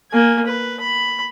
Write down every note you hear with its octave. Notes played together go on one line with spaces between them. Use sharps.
A#3 G#5
B4
B5